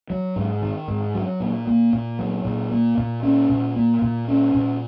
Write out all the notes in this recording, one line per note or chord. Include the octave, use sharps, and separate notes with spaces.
F#3
G#2
D#3
G#2
F#3
A#2
A#3
A#2
F#3
A#2
A#3
A#2
C#4
A#2
A#3
A#2
C#4
A#2